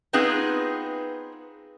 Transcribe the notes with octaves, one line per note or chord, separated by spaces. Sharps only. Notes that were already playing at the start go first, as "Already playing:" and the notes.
B3 C4 D#4 F4 G#4 B4